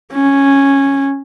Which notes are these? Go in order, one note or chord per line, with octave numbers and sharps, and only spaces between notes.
C#4